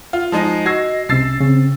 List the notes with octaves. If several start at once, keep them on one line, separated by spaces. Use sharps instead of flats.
F4
F3 G#3 D#4
F#4 D#5 E6 G#6 A#6 C7
C2 C3 C#4 E6 A6 C7
C#3 C4 C#4